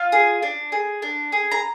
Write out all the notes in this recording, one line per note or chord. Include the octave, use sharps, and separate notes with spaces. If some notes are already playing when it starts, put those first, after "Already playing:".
Already playing: F4 F5
G#4
D4
G#4
D4
G#4
A#5